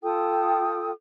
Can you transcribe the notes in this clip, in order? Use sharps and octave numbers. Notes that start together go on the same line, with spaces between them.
F4 A4 G5 D#6